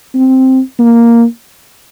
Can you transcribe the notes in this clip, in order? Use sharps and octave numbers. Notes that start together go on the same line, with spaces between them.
C4
A#3